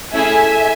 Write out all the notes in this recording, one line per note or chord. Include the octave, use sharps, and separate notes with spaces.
A3 C#4 E4 G#4 E5 G#5